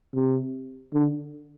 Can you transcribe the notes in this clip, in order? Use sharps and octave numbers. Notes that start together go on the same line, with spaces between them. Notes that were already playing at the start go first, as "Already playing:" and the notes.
C3
D3